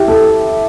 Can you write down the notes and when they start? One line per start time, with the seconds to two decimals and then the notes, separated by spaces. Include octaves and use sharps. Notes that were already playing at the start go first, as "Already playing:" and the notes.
Already playing: E4 G4
0.08 A4